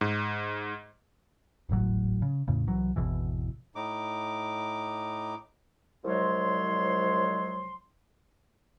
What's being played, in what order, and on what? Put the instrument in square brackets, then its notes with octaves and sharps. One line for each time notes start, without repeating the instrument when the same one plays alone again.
[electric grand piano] G#2
[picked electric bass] D#1 G#1 A2 F#3
C#3
E2 A2 C#3
C2 E3 F#3
G#1 E2 B2 E3
[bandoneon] A2 D#4 D6
[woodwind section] C2 F3 F#3 G#3 C#5 C6